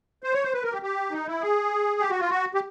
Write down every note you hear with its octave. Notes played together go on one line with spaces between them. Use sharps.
C5
C#5
C5
B4
A#4
G4
G4
D#4
E4
G#4
G4
F#4
F4
F#4
G4